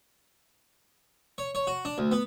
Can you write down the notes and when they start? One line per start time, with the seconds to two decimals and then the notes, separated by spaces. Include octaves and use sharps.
1.38 C#5
1.55 C#5
1.67 F#4
1.85 D4
1.98 D2
2.12 B3